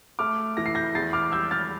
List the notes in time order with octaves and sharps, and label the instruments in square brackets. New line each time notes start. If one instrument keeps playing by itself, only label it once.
[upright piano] A3 D6 F6
E3 A#6
C7
G6 A#6
E2 A6 C7
D6 F6
G3 E6 G6
F6 A6